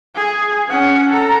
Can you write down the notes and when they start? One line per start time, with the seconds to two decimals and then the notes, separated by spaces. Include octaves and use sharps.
0.16 G#4
0.69 C#4 F#5
1.10 A4 A#5